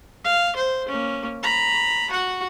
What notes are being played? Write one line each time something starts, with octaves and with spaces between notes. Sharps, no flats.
F5
C5
A#3 C#4
A#5 B5
F#4 F#5